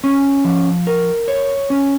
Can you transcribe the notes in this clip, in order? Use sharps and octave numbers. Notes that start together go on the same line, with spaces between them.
C#4
F3
A#4
C#5
C#4